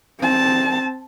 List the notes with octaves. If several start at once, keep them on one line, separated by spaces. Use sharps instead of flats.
C4 A5